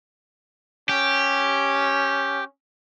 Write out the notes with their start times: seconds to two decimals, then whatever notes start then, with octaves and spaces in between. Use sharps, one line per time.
0.89 C#4 G4